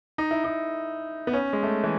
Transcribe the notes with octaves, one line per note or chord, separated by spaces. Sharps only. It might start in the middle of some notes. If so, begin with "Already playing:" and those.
D#4
E4
D#4
B3
C#4
G#3
A3
E3